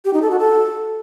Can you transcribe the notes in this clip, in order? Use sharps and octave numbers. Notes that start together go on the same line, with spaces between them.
G4
D#4
A4
F#4
A4